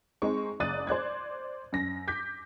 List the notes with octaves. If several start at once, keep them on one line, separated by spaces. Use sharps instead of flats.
G#3 C4 D#4 C#6
F#1 D5 D#6 F#6 A6 D#7
C5 D5 F#6 G#6
F#2 A#6
D6 G6 B6